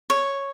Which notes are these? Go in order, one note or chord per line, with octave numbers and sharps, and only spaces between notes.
C#5